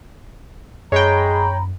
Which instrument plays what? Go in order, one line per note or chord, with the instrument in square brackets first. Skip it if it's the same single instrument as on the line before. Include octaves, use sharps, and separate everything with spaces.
[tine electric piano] F#2 [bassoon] G#3 [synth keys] C#5 G5 [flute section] A#5 B5